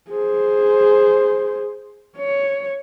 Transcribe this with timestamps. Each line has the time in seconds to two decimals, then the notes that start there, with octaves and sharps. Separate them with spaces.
0.11 G#4 C5
2.18 C#5